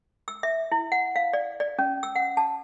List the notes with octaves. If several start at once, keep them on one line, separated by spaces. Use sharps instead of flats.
E6
E5
E4
F#5
F5
D5
D5
C#4
E6
F#5
A5